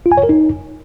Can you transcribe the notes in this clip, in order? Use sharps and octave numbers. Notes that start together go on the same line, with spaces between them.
F4
G#5
C#5
A#4
D#4